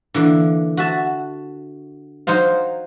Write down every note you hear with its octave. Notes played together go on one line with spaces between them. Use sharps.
D3 E3 A#3
F#4 E5 A5
F#3 D#4 C5 F5